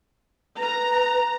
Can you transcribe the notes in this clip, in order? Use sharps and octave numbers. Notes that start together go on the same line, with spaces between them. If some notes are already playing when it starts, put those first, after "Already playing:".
B4 A#5